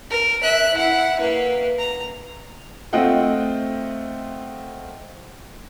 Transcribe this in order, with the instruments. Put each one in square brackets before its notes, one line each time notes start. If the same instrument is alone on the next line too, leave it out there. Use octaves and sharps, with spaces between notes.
[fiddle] A#4
E5 F#6
E4 F#5
A#3 B4
A#5
[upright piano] A3 C4 F4 D#5 F#5 G5